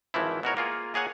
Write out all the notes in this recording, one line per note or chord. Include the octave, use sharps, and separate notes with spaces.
G#1 E3 F3 E4
B2 F#4 A#4 C#5
A#3 F4 G#4
A#3 G#4 C#5 F#5 G#5